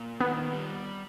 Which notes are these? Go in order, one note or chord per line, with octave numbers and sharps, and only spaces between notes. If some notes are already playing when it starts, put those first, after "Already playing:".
Already playing: A#2
D#3 B3
G3